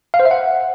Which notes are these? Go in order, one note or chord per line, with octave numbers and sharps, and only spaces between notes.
F5
C5
E5
F#5